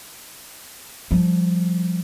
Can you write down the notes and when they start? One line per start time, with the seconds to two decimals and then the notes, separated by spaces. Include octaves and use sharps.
1.11 F3 G3